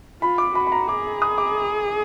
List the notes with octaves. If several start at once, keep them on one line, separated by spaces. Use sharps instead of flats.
F4 B5
D6
F#4 B5
B5
A#5
G#4 D6
D#6
D6